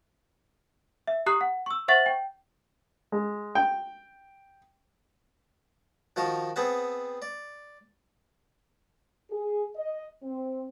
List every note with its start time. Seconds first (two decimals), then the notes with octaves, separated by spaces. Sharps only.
1.07 E5
1.26 G4 A#5 D#6 F#6 C7
1.41 F#5
1.66 C#6 E6
1.88 C5 E5 F#5 C#6 A6 F#7
2.06 G5
3.12 G#3
3.55 G5
6.16 D#3 F3 F#4 A#4 A5
6.56 B3 C4 G#4 B4 F#5 A5
7.22 D5
9.31 G#4
9.76 D#5
10.23 C4